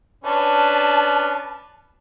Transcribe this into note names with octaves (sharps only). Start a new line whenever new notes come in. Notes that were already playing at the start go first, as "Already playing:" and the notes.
C#4 D4 B4 A5